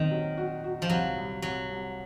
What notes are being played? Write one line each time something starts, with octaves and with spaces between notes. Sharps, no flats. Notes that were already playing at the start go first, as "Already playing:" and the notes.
Already playing: A#2 D#3 C4
F#3
F#4
F#4
F3
C2 F#3
C2
C2 F#3
C2